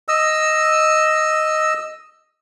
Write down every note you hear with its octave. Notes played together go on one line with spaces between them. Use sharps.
D#5 E6